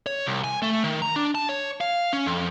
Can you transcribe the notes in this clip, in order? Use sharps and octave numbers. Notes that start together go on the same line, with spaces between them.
C#5
C2
G#5
A3
D#3
A#5
D4
A5
C#5
F5
C#4
F2